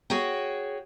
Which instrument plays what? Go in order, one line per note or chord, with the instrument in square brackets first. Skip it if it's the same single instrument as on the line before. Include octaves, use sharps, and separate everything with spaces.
[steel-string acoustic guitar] F#4 G#4 C#5 G5